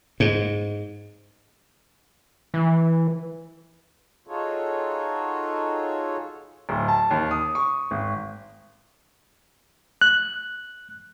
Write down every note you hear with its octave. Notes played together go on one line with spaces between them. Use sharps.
G#2
E3
D#4 F4 F#4 G#4 A4 C#5
D1
A5
D#2
D#6
C#6
G#1
F#6